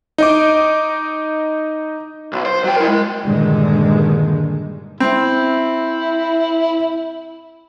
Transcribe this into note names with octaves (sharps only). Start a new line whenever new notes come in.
D#4 D#5 D6
B1
C5
F#3 G5
E4 A#4
G#3
G2 A#2 D3 D#3 G#3
C4 E4